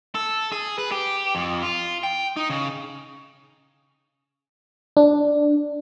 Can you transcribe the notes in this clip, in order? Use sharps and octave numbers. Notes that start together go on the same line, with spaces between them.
A4
G#4
B4
G4
F2
F4
G5
D#4
C#3
D4